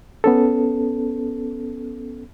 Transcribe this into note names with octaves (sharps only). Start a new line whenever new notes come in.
B3 C#4 A4